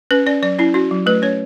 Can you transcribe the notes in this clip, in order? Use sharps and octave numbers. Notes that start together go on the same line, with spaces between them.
C#4 B4
C#4 D5
F#3 D5
C#4 E4
C#4 F#4
F#3
A3 B4
C#4 C#5